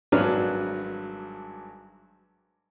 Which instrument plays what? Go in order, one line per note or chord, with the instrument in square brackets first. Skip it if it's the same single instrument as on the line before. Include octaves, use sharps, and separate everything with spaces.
[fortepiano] G#1 G2 F#3 D4 B4 F6